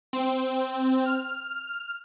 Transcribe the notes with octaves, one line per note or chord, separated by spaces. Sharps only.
C4
F6